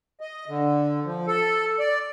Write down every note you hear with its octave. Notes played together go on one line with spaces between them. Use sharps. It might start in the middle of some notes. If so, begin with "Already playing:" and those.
D#5
D3
F3
A4
D5